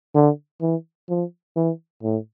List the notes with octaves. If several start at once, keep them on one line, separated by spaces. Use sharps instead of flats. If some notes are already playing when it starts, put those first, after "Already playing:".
D3
E3
F3
E3
A2